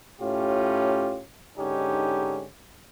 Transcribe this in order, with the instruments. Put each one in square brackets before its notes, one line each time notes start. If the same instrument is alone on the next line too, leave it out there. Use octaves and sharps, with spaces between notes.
[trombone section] A2 C#4 F4 G4
G#2 D3 C#4 D#4 G4